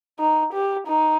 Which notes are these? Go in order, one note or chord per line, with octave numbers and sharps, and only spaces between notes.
D#4
G4
D#4